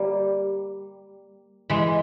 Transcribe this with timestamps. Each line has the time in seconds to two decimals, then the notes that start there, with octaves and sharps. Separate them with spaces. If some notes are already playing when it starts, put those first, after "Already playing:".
Already playing: G3 A#3
1.70 E3 G#3